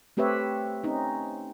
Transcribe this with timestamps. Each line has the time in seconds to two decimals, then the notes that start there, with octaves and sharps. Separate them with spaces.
0.17 A3 C4 G4 B4 C#5 E5
0.84 C4 C#4 D#4